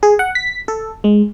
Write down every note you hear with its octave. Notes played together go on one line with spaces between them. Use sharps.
G#4
F#5
B6
A4
G#3